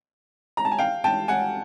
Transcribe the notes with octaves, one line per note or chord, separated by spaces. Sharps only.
A#5
A5
G#5
F5 G5
G5 A5
F#5 G#5